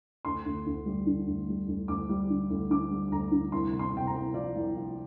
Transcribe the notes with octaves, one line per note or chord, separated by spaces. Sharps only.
D2 C6
D2
D2
G3
D3
D2
G3
D2
D2 D6
G3
D3
D2
D3 D6
G3
D2 A#5
D3
C2 C6
C3
C6
C3 G5
A#5
C2
F3 D5
C2
F3